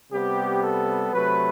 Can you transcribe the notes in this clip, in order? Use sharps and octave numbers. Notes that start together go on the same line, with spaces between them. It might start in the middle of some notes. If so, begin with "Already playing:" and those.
C3 G3 B3 G4
A4
C3 F#3 A3 B4